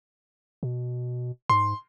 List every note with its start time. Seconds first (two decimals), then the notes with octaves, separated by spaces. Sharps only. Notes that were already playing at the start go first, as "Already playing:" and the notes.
0.63 B2
1.50 G#2 C6